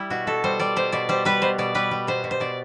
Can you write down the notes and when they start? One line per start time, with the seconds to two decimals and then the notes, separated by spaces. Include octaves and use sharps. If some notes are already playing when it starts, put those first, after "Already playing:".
Already playing: G3 E4
0.10 B2 F#4
0.27 B2 A4
0.44 G3 C5
0.59 G3 D5
0.76 B2 C5
0.92 B2 D5
1.09 G3 C5
1.25 G3 B4
1.42 B2 C5
1.58 B2 D5
1.75 G3 B4
1.91 G3
2.07 B2 C5
2.24 B2
2.31 C5
2.40 B2 D5